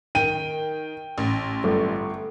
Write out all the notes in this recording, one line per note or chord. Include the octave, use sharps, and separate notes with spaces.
D#3 G5 D#7
A1
G1 A3